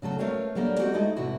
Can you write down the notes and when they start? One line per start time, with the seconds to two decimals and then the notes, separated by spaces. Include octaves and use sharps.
0.02 C#3 F#3 A3 A4
0.18 A3 A#4 B4 C#5 F5 G5
0.55 D3 F#3 G3 A#3 A#4
0.79 G#3 C4 F#4 G4 A#4
0.93 G#3 A3 D#4 E4 D#5
1.16 E2 A2 C3 E3 E4 F#4